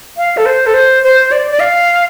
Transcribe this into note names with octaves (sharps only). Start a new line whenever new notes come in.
F5
A4
C5
A4
C5
C5
D5
D5
F5